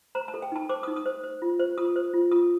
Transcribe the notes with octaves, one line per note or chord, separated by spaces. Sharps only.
C5 A#5
A5
A4
G5
D#4 A5
C5 D6
D#6
D#4
D#6
C5
C5
F4
C5
F4 D#6
C5
F4
F4 D#6